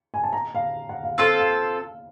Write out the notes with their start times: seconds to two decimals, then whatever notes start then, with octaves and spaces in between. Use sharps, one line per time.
0.14 G#5
0.24 A5
0.33 A#5
0.55 F5
0.89 F#5
1.04 F5
1.18 C4 F4 A4 F5
1.40 F5